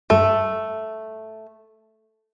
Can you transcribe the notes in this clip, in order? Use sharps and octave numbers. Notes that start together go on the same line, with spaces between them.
G2 A3 A4